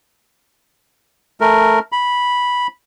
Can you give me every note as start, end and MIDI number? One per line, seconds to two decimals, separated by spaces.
1.41 1.79 57
1.41 1.79 70
1.92 2.67 83